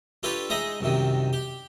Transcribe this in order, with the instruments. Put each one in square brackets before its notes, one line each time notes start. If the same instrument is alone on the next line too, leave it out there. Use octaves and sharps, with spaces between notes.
[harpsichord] D4 F4 G4 A4 B4 C#5
G#3 D#4 G#4 E5 A#5
C2 F#2 C3 D#3
G4